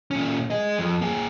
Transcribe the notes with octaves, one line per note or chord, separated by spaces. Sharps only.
A#2 C#4
G#4 D#5
F2
A#3 G#4